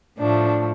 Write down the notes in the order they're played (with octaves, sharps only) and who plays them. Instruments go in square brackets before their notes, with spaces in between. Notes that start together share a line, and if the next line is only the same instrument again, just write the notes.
[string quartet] A2 F3 A3 D4